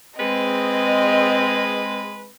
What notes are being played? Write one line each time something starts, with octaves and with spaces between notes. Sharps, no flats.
G#3 C4 B4 D#5